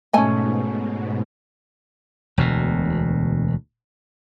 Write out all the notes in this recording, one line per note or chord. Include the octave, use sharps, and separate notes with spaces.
G#2 B2 A3 C#4 D#5 G#5 A5
E1 D2 B2